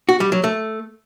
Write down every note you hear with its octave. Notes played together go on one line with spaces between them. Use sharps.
F#4
G3
F#3
A3